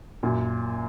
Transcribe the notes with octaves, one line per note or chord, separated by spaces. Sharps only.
F#2 A#2